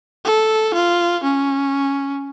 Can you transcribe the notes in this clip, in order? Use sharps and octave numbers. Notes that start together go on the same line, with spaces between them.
A4
F4
C#4